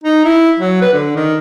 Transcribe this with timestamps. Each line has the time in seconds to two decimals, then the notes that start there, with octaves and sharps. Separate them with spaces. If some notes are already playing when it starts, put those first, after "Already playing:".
0.04 D#4
0.25 E4
0.60 F#3
0.82 B4
0.93 D3
1.16 D#3